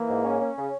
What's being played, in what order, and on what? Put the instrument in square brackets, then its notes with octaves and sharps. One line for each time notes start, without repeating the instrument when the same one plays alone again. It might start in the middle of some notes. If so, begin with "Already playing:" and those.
Already playing: [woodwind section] E3 [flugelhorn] A#3
[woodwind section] G#2
C#4
C#4
C#3